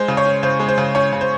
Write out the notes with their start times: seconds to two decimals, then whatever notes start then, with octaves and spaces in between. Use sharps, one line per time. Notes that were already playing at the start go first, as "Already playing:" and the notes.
Already playing: G#3 C5
0.08 C#3
0.17 C#5
0.26 C#4
0.43 C#3 C5
0.60 G#3
0.69 C5
0.78 C#3
0.95 C#4 C#5
1.13 C#3
1.21 C5